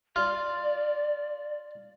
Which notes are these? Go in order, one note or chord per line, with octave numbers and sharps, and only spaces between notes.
F4 D5